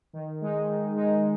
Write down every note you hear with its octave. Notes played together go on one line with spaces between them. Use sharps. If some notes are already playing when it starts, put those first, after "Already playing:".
D#3
G#3 D#4
D#3
G#3 D#4